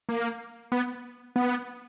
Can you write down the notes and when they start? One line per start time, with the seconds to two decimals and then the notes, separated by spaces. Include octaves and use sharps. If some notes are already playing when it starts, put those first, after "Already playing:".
0.09 A#3
0.72 B3
1.36 B3